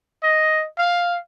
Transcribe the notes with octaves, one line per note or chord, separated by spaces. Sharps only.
D#5
F5